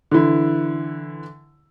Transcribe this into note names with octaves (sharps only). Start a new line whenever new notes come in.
D3 E3 E4